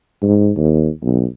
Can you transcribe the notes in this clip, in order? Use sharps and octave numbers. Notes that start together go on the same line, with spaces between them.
G#2
D#2
B1